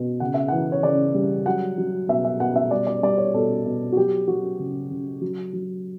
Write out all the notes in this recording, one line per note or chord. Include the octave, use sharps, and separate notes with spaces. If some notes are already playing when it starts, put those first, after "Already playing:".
Already playing: B2
C#3 F#5
E5
E3 F#5
C#5
C#3 D5
G3
F#3 F#5
F#3
B2 E5
E5
B2 F#5
E5
G3 D5
D5
G3 D5
C#5
B2 A4
B2
F#4
F#3 G4
F#3 F#4
C#3
C#3
F#3
F#3